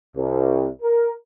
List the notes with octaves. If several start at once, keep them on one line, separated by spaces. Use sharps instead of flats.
C2
A#4